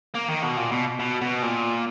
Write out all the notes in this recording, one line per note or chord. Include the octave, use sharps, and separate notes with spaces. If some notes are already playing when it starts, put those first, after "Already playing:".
A#3
D#3
B2
A#2
B2
B2
B2
A#2